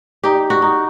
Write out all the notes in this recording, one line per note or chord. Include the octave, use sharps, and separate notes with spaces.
D#4 G4
F#4
D#4